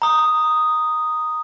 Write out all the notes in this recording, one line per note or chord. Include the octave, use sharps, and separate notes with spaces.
A#5 D#6